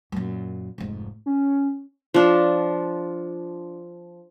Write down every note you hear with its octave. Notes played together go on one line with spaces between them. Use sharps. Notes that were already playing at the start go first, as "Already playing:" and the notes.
F#2 A#2
F1 G#2
C#4
F3 D4